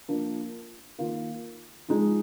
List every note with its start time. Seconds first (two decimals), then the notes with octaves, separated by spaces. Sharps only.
0.08 F3 A#3 D4
0.98 D#3 A#3 F4
1.88 F3 G#3 D#4